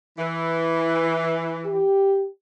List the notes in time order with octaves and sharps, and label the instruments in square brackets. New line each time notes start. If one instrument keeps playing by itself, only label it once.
[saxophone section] E3
[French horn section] G4